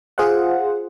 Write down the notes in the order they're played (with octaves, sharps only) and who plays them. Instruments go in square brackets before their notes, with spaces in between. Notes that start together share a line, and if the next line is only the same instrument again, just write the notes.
[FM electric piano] F4 G#4 C5 F5 F#5